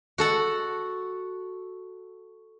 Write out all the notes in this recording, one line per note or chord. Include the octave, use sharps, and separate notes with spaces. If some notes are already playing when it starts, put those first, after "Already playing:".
F#4 A4 F#5